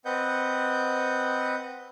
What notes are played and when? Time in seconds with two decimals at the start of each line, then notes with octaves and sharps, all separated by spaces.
0.05 C4 B4 D#5 F#5 G6